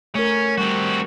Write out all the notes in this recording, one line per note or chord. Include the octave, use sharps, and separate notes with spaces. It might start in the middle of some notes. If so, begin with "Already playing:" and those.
A3 C#4 A#4
G3 C4 F#4